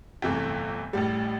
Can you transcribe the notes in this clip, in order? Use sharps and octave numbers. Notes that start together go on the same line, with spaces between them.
G1 F2 C3 E3 A3
A1 A2 G3